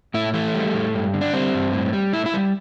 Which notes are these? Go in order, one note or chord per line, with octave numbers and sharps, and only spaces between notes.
A2 E4
E3 A3
G3
A2
G2
D3
D4
G3 C4
G2
A2
G3
A2 E4
E4
G3